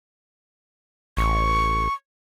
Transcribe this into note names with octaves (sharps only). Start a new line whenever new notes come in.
A1 C#6